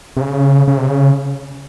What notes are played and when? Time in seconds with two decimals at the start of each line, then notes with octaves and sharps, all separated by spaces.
0.17 C3
0.21 C#3
0.68 C#3
0.77 C3
0.88 C#3